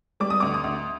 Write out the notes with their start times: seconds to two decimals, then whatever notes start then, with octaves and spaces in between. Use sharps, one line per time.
0.20 G3 D6
0.30 D#6
0.40 D2 D6
0.54 D#6
0.64 D2